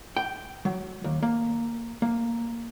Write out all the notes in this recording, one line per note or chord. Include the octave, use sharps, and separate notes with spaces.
G5
F#3
D#2
A#3
A#3